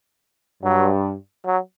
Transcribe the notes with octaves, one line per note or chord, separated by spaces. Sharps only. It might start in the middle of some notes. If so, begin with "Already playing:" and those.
G2 F#3
F#3